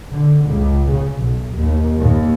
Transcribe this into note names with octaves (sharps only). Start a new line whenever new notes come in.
D3
C#2
C#3
B1
D#2
D#2